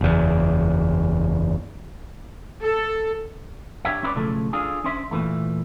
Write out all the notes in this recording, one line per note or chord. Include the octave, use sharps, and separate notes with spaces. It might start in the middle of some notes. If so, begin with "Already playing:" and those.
F#1 E2
A4
D4 G4 C#5 E5
C#4 E4 B4 D5
B1 A2 C#3 F3 A3 A4
D4 F4 G#4 A4
C#4 D4 C5 E5
A#2 C#3 E3 A3